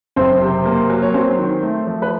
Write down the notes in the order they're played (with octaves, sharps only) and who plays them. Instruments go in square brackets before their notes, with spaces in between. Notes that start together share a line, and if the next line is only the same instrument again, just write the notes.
[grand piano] F#1 [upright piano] C4 C5
[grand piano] C3
A#3
F#3
[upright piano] C#5
[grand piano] F#3 [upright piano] C4 C5
[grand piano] D#3
A3
F3
[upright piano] B4